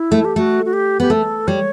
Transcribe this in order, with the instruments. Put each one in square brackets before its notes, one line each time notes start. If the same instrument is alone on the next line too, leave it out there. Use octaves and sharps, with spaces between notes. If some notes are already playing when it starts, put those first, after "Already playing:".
Already playing: [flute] E4
[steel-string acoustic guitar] A3
[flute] G4
[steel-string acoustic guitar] A3 [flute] F#4
[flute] F#4
G4
[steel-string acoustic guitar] B3 [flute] G4
[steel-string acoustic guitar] A3 [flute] A4
[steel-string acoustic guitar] G3 [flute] C#5